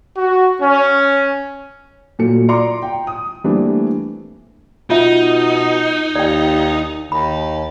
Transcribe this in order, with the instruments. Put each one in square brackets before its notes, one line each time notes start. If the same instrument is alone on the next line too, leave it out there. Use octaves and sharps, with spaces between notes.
[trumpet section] F#4
C#4
[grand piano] A#2 F#3 A4 C#7
D5 A#5 C6 D6 C#7
G5
D#6
E3 G3 A3 A#3 C4 D4
[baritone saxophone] B2 [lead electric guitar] D#4 [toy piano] F4 E5
[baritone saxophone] D#2 [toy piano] D5 G5
[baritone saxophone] D#2 [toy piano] B5